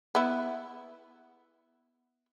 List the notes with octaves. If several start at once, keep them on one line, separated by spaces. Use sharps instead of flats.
B3 E4